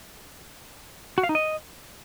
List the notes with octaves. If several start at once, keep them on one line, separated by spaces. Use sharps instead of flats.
F#4
F5
D#4
D#5